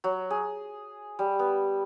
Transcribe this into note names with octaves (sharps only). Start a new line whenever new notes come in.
F#3
G#4
G3
B3